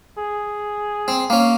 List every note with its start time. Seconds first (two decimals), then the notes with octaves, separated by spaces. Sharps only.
0.17 G#4
1.08 C4
1.30 A#3 C#4